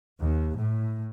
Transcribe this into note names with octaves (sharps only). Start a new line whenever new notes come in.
D#2
A2